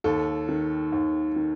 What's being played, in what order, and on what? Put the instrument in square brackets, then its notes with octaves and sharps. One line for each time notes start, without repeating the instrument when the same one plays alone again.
[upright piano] D#2 A4
D#3
D#2
D#3